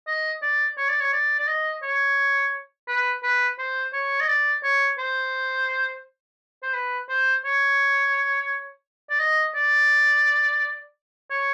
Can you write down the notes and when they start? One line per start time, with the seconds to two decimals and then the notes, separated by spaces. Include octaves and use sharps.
0.07 D#5
0.42 D5
0.77 C#5
0.89 D5
1.00 C#5
1.13 D5
1.39 D5
1.48 D#5
1.83 C#5
2.88 B4
3.23 B4
3.59 C5
3.93 C#5
4.21 D#5
4.28 D5
4.64 C#5
4.99 C5
6.63 C5
6.74 B4
7.09 C5
7.45 C#5
9.10 D5
9.20 D#5
9.55 D5
11.31 C#5